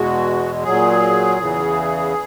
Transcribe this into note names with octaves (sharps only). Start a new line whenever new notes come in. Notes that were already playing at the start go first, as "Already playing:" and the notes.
Already playing: E2 B2 G#3 F#4
A#2 F#3 G#4
E2 C#3 E3